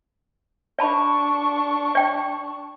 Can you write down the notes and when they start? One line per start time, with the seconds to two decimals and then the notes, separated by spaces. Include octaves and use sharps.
0.79 D4 D5 A5 B5 C#6
1.95 D5 G5